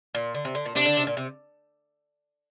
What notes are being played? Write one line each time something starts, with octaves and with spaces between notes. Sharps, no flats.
A#2
D3
C3
D3
A#2
C3 D4
D3
C3
A#2
C3